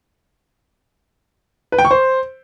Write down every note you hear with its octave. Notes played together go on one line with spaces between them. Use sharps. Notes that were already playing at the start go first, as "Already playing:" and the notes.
B4
G5
C#6
C5